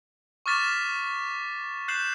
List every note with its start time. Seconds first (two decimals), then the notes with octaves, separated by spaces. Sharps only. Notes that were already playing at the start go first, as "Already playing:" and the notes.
0.46 C#6 D6 F6 A6 B6 E7
1.88 F#6 G6 C7 E7 F#7